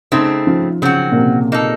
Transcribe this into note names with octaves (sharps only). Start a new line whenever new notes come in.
C#3 A3 C4 D#4
F3
C#3 F#3 C4 F#4
A#2
C3
A#3 D#4 A4